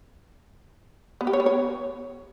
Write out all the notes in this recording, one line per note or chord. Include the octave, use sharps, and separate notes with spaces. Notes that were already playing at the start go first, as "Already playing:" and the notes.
B3
G4
C#5
B3
C#5